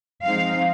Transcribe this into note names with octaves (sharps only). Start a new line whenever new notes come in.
F3 G#3 C4 D#4 F5